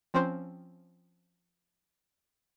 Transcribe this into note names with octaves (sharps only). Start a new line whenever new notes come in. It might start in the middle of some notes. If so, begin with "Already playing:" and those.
F3 C4 C#4 C5